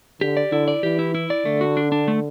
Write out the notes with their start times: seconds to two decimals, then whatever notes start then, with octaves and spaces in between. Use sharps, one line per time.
0.21 D3 G4
0.37 D5
0.51 D3 E4
0.68 D5
0.83 E3 G4
0.99 E4
1.15 E4
1.30 D5
1.45 D3 A3
1.61 F#4
1.77 D4
1.92 D4
2.08 A3